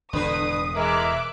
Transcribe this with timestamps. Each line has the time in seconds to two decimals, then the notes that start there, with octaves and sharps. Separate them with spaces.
0.13 E1 A2 D3 B4 D#6
0.76 E3 G#3 A#4 E5 D6 F#6